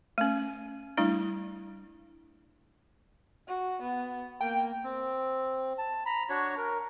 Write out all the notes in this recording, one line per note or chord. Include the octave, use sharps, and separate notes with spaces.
A3 C#4
G3 A3 D4 E4
F#4
B3
A#3 G5
C4
A5
A#5 B5
D4 F#4 C#5
A#4